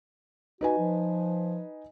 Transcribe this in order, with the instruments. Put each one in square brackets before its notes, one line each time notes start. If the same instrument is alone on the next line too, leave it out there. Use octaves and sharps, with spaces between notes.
[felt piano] D#4 B4 G#5 [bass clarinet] F#4
[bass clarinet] F3